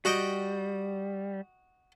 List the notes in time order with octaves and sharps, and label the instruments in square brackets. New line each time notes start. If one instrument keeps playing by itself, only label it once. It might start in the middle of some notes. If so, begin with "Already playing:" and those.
[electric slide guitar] G3 [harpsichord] F#4 D#5 G5